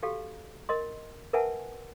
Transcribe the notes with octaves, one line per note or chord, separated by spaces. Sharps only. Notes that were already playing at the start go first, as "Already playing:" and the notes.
F#4 G4 A4 F5
A#4 D#5 C6
A#4 B4 E5 F#5 G#5 A5